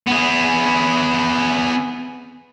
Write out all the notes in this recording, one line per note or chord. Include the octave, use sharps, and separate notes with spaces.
B3 G#4